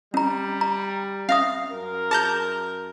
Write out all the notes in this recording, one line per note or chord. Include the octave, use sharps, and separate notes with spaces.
G3 C#4 A#5
A#5
C#4 E5 F5 D#6
F#2 A#4
G#4 A5 A#5 G6